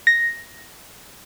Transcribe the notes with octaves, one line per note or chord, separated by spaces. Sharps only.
A#6